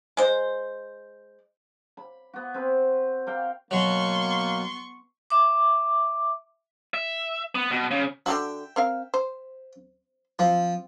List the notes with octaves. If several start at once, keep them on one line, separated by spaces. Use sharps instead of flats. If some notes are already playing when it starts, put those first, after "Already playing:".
G#3 C5
B5
B3 F#4
C4 B4
A#4 F5 G5
B2 F#3 A#3 B3 C6 C#6
E5 D6
E5
B3
B2
C#3
D3 F4 F#4 E5 G5
C4 A#4 F5
C5
F3 C4